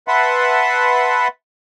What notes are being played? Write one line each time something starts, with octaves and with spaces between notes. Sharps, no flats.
B4 E5 F#5 A5 B5 C6